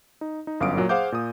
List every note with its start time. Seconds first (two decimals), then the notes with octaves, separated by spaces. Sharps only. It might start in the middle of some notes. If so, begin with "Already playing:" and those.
0.21 D#4
0.47 D#4
0.60 G1 F#2 F5 D#6 D7
0.77 A#2 F#3 A#3
0.89 G#4 C5 F5 F#5 D6 G6
1.12 A#2 D#6